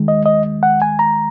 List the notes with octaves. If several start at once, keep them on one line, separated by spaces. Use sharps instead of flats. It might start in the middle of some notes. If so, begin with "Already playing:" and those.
Already playing: D#2 D#3 G#3
D#5
D#5
F#5
G#5
A#5